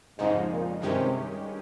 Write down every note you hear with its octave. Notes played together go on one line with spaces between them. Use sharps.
F2 G#2 C#3 F3 G#3 D#4
A#2
G2 C3 D#3 G#3 C#4 G4